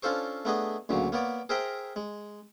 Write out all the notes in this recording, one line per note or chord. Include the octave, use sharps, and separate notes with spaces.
C#4 D4 F4 A4 C5 C#6
A3 B3 D4 G#4 D#5
D2 A#2 C#3 F#3
A#3 B3 C#5 D5
G#4 A#4 C5 E5 G5 A#5
G#3